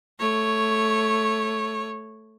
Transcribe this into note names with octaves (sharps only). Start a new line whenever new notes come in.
A3 C#5